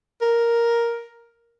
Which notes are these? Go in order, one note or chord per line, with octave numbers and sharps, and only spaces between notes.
A#4